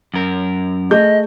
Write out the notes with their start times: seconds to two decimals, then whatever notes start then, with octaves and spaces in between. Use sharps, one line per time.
0.14 F#2 A#4
0.91 A3 G#4 D#5 G6